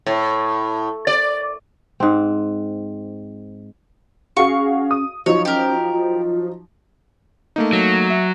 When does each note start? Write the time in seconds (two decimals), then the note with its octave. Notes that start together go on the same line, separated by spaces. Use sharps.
0.06 A2
1.07 D5
2.00 G#2 C4
4.37 C#4 F#4 G#4 F5 C#6
4.91 D#6
5.26 F3 F#3 D#4 C#5
5.45 C#4 G4 A#4
5.93 F4
7.56 A3 A#3 D#4
7.73 F#3
8.10 E5